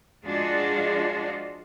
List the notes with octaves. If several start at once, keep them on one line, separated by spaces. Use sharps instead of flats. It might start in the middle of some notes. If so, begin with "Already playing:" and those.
F3 G#3 D4 F4 F#4 G#4